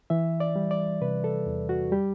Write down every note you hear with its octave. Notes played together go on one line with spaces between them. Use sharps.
E3 E5
D5
G3
D5
C3 B4
A4
E2
F#4
G3 G4